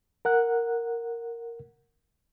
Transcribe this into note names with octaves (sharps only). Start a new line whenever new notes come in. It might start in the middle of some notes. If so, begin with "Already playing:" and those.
A#4 F#5 F#6